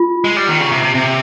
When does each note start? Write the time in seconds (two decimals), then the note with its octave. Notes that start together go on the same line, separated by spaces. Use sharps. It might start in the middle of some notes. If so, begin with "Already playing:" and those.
Already playing: F4
0.25 G#3
0.36 G3
0.48 D#3
0.60 C#3
0.72 C3
0.83 C3
0.95 C3